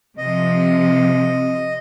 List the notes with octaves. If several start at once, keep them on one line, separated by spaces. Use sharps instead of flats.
C3 F3 D#5